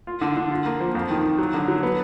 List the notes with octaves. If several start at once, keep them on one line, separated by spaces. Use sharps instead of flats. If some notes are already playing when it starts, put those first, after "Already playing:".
F4
D3
D3
F4
A#3
F3
F2
D#3
D#3
F#3
D3
F#3
B3